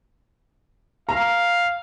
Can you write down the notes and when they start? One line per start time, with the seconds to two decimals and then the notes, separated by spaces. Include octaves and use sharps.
1.09 F5 A#5